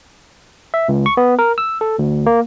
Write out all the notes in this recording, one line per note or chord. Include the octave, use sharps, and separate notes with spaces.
E5
C#2
C#6
B3
A#4
E6
A4
D2
A#3